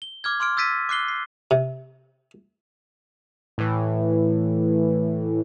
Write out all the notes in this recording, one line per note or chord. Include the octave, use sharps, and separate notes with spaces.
G7
D6 F6 G#6
C6 D6 F6 D7
E6 G6 A6 B6 D7 D#7
D6 F#6 C7 G7
C7
C3
A2 E3